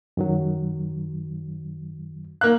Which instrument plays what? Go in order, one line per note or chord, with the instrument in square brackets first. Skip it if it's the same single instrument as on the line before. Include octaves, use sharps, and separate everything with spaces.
[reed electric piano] F#2 D#3 F#3
[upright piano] A#3 F#6 [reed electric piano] F5